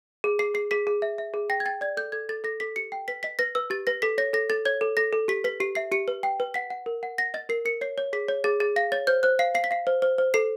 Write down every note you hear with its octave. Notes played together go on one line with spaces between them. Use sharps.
G#4
G#4 C7
G#4 C7
G#4 B6
G#4
E5
E5
G#4
G5 A#6
G#6
G5 A6
D5 G#6
A4 G6
A4 G#6
A4 A6
A4 A#6
A4 B6
G4 C#7
G5 C7
B4 B6
D#5 B6
B4 A#6
B4 E6
G4 A6
B4 A#6
A4 B6
C#5 A#6
A4 A#6
A4 A6
C#5 G#6
A4
A4 A#6
A4
G4 B6
B4 B6
G4 C7
E5 C7
G4 C#7
B4
G5 C7
B4
F#5 B6
F#5
A#4
F#5
F#5 A#6
D#5 A6
A#4 C7
A#4 C#7
C#5 C7
C#5
G#4 B6
C#5
G#4 A6
G#4 A6
F5 A#6
C#5 A6
C5 G6
C5 F#6
F5 C7
F5 C7
B6
F5 C7
C5
C5
C5
A4 C7